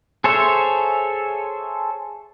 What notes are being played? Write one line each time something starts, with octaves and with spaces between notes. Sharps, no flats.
G#4 A4 C5 C#5 E5